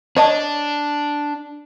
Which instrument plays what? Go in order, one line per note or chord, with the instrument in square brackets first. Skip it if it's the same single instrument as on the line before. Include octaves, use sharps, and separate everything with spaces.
[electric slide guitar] D4 [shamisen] C#5 D#5 A5